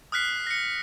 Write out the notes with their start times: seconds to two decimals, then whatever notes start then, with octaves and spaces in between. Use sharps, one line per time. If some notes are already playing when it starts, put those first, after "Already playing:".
0.12 D#6 F6 F#6 B6 C7
0.47 A#6 C#7